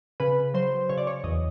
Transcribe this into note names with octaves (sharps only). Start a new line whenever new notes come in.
C#3 B4
F#3 C5
C#3 C#5
D5
C#5
E2 D#5